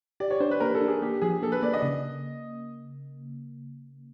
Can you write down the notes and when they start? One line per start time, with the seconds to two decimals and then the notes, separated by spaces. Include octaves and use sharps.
0.20 G4 D5
0.31 C#5
0.40 D4 C5
0.51 B4
0.60 A#3 A#4
0.75 A4
0.81 D4
0.88 G#4
1.02 A#3 G4
1.22 F3 G#4
1.42 A#3 A4
1.52 B4
1.62 A#3 D5
1.73 D#5
1.83 C#3